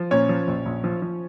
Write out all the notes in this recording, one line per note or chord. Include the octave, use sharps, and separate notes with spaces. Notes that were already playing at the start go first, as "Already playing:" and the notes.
Already playing: F3
A#2 C#4 C#5
F3
A#1
A#1
F3
F3